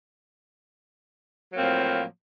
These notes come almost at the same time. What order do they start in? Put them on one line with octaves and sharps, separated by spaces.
F#3 A#3 C4 A2 F3